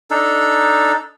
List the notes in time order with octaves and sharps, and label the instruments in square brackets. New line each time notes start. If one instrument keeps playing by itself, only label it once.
[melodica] D4 D#4 A4